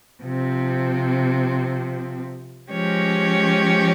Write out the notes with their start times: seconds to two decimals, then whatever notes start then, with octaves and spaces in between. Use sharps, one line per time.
0.24 C3 F3 C4
2.71 F3 G#3 C#4 G4 C#5